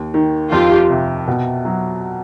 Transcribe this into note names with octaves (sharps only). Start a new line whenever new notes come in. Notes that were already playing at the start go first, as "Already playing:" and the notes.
Already playing: D#2
D#3
F2 F4 G4
C3
B2
F#3